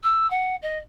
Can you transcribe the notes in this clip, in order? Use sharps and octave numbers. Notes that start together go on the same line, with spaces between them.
E6
F#5
D#5